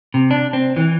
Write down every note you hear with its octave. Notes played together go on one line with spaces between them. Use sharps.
C3
D4
C4
E3